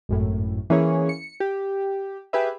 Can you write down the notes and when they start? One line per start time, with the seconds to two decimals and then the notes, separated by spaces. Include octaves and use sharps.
0.09 G#1 F#2 A2
0.70 E3 A#3 C#4 G#4 C#5
1.09 C#7
1.40 G4
2.33 G4 G#4 B4 E5